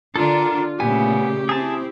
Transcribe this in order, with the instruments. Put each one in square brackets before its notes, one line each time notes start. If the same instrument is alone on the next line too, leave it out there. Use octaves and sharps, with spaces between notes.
[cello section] D3 D4 [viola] F4 [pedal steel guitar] A4 A#4
[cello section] A#2 C#3 A3 [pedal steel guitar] B3 G#5 [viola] G4
[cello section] C4 E4 [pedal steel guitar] G#4 A5